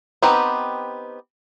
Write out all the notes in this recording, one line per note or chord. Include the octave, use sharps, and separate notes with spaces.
B3 C4 D#4 G4 B4